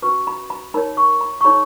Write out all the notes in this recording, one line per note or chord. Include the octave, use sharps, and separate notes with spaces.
C#4 F#4 B4 C#6
B5
B5
D#4 A#4 C#5 B5
C#6
B5
C#6
D#4 G#4 C#5 B5